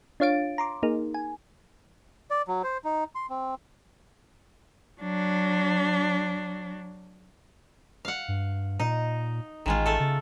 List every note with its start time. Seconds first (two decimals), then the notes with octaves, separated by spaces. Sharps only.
0.20 D4 F4 C#5 F5 A6 D7
0.58 A#5 C6 D6
0.83 A#3 D#4 G#4 A#4
1.14 G#5
2.31 D5
2.48 F#3
2.64 C5
2.84 D#4
3.15 C6
3.30 C4
5.01 F#3 D4
8.05 F5 F#5
8.28 G2
8.79 A#2 D#4
9.66 A1 D#3 G#3 F4
9.86 A3 A4
10.00 C#3